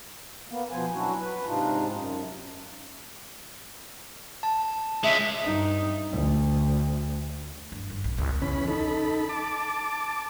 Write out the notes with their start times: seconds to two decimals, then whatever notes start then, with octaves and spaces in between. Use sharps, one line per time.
0.50 A#3 B3
0.71 B2 F3 B3 C5 G#5
0.94 F#3 C#4 D4 E4 F#4
1.19 B4
1.46 G#2 C3 D4 D#4 F4
1.91 F#2
4.43 A5
5.04 C#2 G#3 E5
5.44 G2 D#4
6.12 D2
7.72 G2
7.90 G1
8.04 B1
8.18 C2
8.42 E2 C#3 C#4 B5
8.68 D#4 A4 B5
9.29 A5 D6